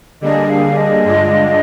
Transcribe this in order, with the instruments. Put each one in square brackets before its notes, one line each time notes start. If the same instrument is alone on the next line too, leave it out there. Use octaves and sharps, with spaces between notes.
[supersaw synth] D3 G3 A#3 D4 G#4 [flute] D#5
[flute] F5
D#5
[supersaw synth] G2 D3 G#3 D4 F4